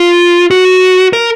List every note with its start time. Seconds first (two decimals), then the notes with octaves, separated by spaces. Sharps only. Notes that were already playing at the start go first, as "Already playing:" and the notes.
Already playing: F4
0.51 F#4
1.13 A#4